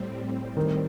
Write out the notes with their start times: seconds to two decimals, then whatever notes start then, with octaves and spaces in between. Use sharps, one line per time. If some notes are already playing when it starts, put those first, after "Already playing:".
Already playing: A2 G3 C4
0.57 D#3